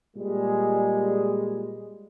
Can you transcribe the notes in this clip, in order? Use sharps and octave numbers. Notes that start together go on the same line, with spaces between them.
A#2 G3 G#3